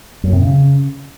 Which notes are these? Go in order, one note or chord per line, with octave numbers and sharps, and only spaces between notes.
F#2
C3
C#3